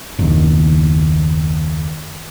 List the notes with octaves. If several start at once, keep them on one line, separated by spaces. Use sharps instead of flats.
F#1 D#2